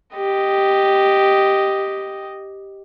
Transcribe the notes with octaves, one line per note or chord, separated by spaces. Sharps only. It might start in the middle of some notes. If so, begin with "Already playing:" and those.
G4 D#5